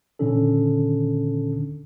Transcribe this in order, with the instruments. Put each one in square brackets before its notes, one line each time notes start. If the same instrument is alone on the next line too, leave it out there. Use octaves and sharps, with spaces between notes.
[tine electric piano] A#2 D3 D#3 C#4 D4 A4